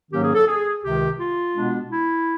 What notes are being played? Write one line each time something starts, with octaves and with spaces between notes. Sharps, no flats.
G#2 D#3 F#3 A#3 C#4 G4
G#4
A4
G#4
C#2 C3 D#3 G4
F4
B2 G#3 B3 D4
E4